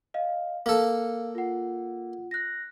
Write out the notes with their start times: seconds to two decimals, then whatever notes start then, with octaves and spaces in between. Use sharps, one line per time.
0.14 D#5 F5
0.66 A#3 A4 F5
1.35 F4 F#5
2.31 F#6 A#6